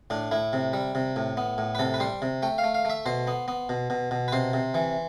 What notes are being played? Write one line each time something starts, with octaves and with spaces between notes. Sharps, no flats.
A2 D4
A2 E4
C3
G3
C3
A2
B3
A2
B4
C3 A4
B4
G3 C5
C3
A3 G5
F5
A3
F5
A3 E5
B2 C5
B3
B3
B2
B2
B2
B4
C3 C5
C3
E3